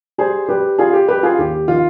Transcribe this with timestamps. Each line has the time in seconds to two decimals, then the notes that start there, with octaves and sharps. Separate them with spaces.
0.18 G3 G#4 C5
0.49 G3 G4 B4
0.79 G3 F4 G#4
0.93 G4
1.08 G3 G4 B4
1.23 F4 G#4
1.39 D#2 G4
1.68 D#3 F4